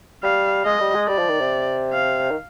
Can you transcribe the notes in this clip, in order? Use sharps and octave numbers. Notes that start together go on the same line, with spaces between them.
G3 F5
G#3 D#5
G3
G#3
G3 D5
F3
D#3
C3
F5
D#3